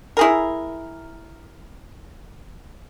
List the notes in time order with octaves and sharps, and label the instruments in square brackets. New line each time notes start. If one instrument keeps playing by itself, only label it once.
[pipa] E4 G#4 A#4